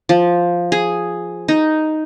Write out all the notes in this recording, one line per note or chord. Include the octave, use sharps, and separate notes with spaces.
F3
G#4
D#4